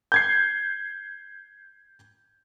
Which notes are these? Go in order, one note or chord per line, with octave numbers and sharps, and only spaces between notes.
G6 G#6 C7